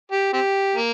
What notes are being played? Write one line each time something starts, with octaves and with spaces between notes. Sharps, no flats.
G4
C4 G4
A#3